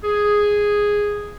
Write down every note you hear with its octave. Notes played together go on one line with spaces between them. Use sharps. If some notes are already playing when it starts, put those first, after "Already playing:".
G#4